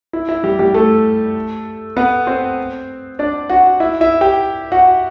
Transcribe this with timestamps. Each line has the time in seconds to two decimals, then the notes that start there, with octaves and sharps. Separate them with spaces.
0.13 E4
0.29 E4
0.44 G3 G4
0.59 G3 G4
0.74 A3 A4
1.97 B3 B4
2.27 C4 C5
3.19 D4 D5
3.50 F#4 F#5
3.80 E4 E5
4.01 E4 E5
4.21 G4 G5
4.72 F#4 F#5